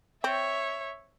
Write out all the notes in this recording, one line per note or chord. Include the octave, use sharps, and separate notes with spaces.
C4 C#5 E5